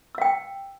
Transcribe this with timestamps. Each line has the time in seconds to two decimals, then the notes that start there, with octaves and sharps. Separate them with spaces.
0.15 E6
0.18 F5
0.22 G5